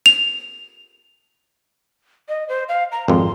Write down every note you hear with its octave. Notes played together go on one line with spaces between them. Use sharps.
F7
D#5
C5
F5
A#5
G#1 F2 C6